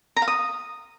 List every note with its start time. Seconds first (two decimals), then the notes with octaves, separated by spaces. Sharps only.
0.16 A#5
0.22 F5
0.28 D#6